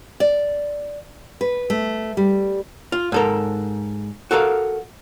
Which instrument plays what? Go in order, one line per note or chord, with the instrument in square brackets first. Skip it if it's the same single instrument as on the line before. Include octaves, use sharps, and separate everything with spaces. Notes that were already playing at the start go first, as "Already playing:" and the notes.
[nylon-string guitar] D5
B4
A3
G3
[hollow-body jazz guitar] F4
G#2 A4 A#4
F#4 A4 A#4 F5